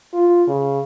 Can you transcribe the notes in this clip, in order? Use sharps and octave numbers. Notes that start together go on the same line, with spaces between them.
F4
C#3